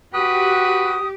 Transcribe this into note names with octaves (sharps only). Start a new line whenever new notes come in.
F#4 G4 B4 D#6